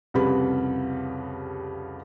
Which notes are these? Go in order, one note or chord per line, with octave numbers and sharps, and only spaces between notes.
C2 F2 C#3 G3 B4 B5